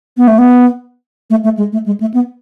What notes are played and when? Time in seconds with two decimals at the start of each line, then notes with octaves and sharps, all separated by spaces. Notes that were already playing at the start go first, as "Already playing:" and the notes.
0.17 B3
0.28 A3
0.38 B3
1.30 A3
1.44 A3
1.57 G#3
1.73 A3
1.86 G#3
2.00 A3
2.14 B3